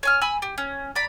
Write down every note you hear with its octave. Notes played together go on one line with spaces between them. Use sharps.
C#5 G#5 F6
G#5 B5 E6
G4
C#4
D5 A#5 B5